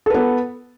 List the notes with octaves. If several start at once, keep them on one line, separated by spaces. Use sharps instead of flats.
B3 A4 B4